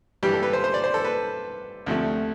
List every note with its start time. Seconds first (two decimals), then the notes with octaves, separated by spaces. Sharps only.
0.23 G2 E3 G3 G4
0.33 A4
0.43 B4
0.53 C5
0.64 C5
0.74 D5
0.84 C5
0.94 A4
1.04 B4
1.86 D2 C3 F3 A3